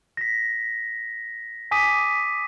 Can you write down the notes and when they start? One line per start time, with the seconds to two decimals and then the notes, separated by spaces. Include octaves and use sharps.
0.17 A#6 B6
1.71 G#5 D6 D#6 B6 D#7